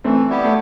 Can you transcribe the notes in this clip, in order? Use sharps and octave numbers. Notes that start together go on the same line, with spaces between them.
E3 A3 C4
G3 B3 E4 G4
A3